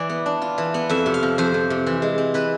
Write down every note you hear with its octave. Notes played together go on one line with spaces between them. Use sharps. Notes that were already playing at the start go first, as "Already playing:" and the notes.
Already playing: E3 D5
B3
D4
F4
E3
B3
F2 E5
C3
F5
F3
F2 C5
F2
C3
E3
G#3
C4
E3 B4